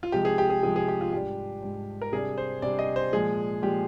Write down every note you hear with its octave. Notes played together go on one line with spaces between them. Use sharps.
F4
C3 F3 G#3 G4
G#4
G4
G#4
C3 F3 G#3 G#4
G#4
G4
F4
G#2 G3 D4 G4
G#2 G3 D4
A#4
C3 G3 D4 G#4
C5
C3 G3 D4 D5
D#5
C5
A#2 F3 G#3 G#4
A#2 F3 G#3 G4